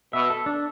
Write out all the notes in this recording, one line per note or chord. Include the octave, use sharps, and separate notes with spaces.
B2 E5
A4
D4